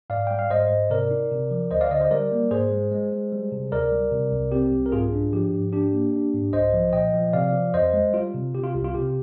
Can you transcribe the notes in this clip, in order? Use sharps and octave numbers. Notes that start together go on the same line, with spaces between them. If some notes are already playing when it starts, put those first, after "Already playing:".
G#2 D5 F5
G3 G5
F5
G#2 C5 D#5
G#2
C3 A#4 D5
D#4
C3
F3
D2 C5 D#5
D5 F5
D3 C5 D#5
C5 D#5
G3 A#4 D5
A#3
G#2 G#4 C5
G#3
G#3
G#3
G3
C3
D2 A#4 D5
G3
C3
C2
C4 G4
C2
A#4
G#2 F4 G#4
D4
F3 G4
G#2
D4 G4
A#3
D4
G#2
C2 C5 D#5
F3
A#2 D#5 G5
F3
C3 D5 F5
F3
F2 C5 D#5
G#3
G3 F4
C3
C3 G4
F4
C2 G4
F4
C3 G4